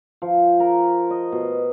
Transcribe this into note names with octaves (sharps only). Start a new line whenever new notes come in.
F3
A#4
D#5
B2